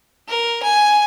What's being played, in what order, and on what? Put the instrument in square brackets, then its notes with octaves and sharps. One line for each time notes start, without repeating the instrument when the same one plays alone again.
[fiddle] A#4
G#5